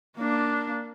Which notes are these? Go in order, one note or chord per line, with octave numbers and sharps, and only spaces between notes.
A#3 D4